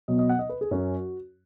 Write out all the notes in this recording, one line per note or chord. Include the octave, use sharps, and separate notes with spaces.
B2 F#3 B3 D#5
D#5
F#5
D#5
B4
G#4
F#2 F#3 C#4 F#4